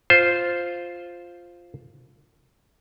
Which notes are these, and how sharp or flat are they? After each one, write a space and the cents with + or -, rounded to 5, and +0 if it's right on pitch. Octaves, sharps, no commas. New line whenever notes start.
F4 +0 C5 +0